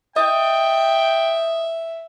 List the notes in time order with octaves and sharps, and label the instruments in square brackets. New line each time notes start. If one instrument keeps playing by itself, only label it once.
[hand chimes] D#5 D#6 [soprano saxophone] E5 [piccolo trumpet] G5